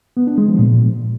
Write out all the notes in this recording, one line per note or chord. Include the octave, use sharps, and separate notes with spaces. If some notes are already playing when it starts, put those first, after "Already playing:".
B3
D4
G#3
F3
A#2